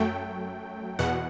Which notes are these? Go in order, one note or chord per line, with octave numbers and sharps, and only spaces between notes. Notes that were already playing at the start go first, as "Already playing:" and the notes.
Already playing: F#2 F#3 A3 G5
E2 B2 F#5